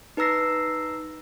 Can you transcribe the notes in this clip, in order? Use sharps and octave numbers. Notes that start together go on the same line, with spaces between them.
D#4 B4 A#5 E6 A#6 C7